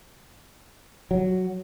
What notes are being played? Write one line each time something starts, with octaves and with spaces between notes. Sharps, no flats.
F#3